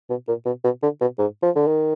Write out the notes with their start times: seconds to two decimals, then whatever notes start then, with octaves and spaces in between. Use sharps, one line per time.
0.10 B2
0.28 A#2
0.46 B2
0.64 B2
0.82 D3
1.01 B2
1.19 G#2
1.43 F3
1.56 D3
1.67 D#3